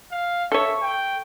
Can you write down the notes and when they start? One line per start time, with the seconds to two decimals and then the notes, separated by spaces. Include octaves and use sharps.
0.11 F5
0.52 A4 C#5 E5
0.82 G5